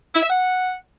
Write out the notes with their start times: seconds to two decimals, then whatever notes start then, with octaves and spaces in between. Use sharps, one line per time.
0.14 E4
0.22 E5
0.30 F#5